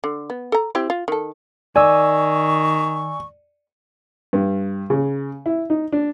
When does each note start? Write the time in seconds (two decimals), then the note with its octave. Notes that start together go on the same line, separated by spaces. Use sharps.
0.04 D3
0.30 B3
0.52 A4 A#5
0.75 C4 E4 G4
0.90 F4
1.08 D#3 A4
1.76 D#3 D5 G#5 C#6 E6
4.33 G2
4.90 C#3
5.46 E4
5.70 D#4
5.92 D4